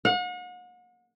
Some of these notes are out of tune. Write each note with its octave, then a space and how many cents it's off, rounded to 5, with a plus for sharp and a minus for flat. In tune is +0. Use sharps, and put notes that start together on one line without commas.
F#5 -40